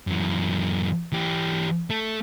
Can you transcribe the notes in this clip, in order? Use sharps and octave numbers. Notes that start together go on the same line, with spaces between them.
F#2 E3
E3 G4
A3 A4